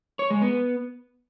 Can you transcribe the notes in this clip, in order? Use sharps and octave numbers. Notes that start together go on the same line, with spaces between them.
C#5
G#3
B3